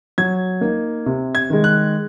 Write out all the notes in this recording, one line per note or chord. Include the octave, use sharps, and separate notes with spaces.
F#3 G#6
A#3 D#4
C3
G#6
D#3 G#3
F#6